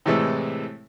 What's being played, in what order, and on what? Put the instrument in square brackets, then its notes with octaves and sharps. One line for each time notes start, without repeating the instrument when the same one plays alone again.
[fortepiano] A2 C3 E3 G#3 A3 A4